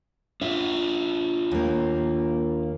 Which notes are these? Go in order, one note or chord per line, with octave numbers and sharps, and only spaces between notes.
D4 F4 E5
D#2 A#3